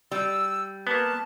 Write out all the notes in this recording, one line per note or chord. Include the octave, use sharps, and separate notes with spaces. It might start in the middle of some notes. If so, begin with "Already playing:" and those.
G3 E6
A#3 B3 A5